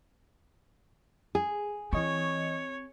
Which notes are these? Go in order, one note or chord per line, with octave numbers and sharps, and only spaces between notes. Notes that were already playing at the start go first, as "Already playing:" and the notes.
G#4
E3 C4 C#5 D#5 C#6